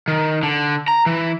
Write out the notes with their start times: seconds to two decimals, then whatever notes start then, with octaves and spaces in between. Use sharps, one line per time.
0.08 D#3
0.43 D3
0.88 A#5
1.06 E3